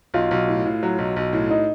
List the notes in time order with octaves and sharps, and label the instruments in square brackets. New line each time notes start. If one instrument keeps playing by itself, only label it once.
[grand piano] B1 [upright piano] F4
[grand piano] B1
A2
A2
F#3
B1
B1
A2
[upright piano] D#4